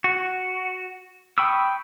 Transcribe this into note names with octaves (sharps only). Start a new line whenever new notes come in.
F#4
G5 B5 C#6 D#6 E6